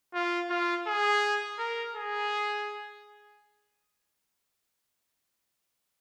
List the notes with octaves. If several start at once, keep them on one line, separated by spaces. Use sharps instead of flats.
F4
F4
G#4
A#4
G#4